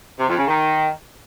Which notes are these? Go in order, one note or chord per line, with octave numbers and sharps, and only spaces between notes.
C3
F2
C#3
D#3